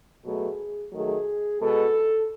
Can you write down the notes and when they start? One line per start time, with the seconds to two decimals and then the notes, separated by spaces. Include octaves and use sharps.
0.24 B2 F#3 A3 G#4
0.92 D#3 F#3 A3 G#4
1.61 B2 G#3 A4